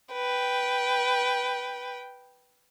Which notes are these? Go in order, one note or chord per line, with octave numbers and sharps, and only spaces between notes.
B4 G5